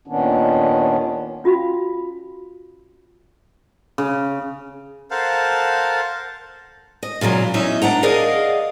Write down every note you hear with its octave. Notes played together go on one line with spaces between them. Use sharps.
D#2 A#2 D#3 B3 C#4 D4
C#4 F4 F#4 F5 B5
C#3
A4 A#4 C5 F5 F#5 A5
D#5
A#2 C#3 F3 F#3 A#3
E2 F#3 C#4 D#4 D#5 E5
D#3 D4 F#5 A#5
G#4 A#4 D5 D#5 F5 F#5